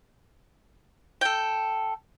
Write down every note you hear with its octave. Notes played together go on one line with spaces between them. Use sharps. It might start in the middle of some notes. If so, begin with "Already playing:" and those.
A4 G5